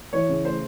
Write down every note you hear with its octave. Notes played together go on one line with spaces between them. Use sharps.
E3 C#5
C#3
A3 C5